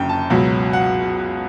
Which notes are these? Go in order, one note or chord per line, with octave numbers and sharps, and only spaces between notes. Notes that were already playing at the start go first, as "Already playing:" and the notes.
Already playing: F#1 F#2 D3 G5
A5
C#2 B2 F#3
F#5